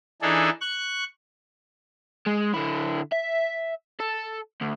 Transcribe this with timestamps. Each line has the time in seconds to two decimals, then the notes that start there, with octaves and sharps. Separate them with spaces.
0.22 E3 D4 D#4 G#4 A4
0.61 C#6 F#6
2.26 G#3
2.54 D3 E4
3.12 E5
4.00 A4
4.61 D2